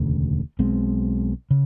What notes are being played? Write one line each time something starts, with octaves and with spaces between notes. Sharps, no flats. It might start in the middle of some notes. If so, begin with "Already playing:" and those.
Already playing: E1 D2 C#3
B1 B2 G#3 C4
C#3